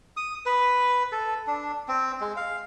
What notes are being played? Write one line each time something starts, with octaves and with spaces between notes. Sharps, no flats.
D#6
B4
A4
D4
C4
G#3
F5